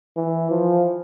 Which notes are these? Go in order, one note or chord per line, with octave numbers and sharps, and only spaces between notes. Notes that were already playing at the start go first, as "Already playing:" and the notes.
E3
F3